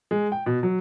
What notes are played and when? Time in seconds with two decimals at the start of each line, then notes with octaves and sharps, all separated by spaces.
0.11 G#3
0.32 G5
0.46 B2
0.63 F#3